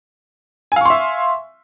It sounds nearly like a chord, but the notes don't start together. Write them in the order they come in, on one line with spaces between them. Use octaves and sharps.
G#5 F5 C#6 C6 E5